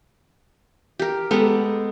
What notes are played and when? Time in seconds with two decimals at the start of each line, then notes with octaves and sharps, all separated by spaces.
0.99 G4 A#4
1.31 G#3 B3 G4 A4